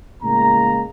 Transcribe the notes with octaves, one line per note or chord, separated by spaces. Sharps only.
A2 C#3 G#3 A#3 A#5